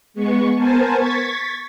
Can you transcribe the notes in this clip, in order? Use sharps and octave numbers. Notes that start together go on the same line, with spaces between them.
G#3 B3 C#6
B3 A#4 C5 G#5 A5
C#6 G#6 A6 B6